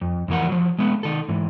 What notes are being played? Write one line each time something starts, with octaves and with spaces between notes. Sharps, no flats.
F2
F2 E3 A#4 F#5
F3 F#3
G#3 A3 B3
D#3 A4
G#2 E3